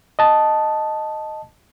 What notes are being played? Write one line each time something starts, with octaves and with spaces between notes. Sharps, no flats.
D#5 A5